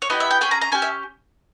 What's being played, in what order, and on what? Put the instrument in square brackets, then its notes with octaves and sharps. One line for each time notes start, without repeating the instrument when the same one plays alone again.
[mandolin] C#5
B3 E4 G4 D#5
E5
G5
C#4 G#4 G5
A#5
A#5
C#4 G4 G#5
E5